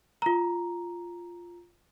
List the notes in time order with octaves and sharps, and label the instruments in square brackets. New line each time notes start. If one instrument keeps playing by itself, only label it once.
[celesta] F4 A#5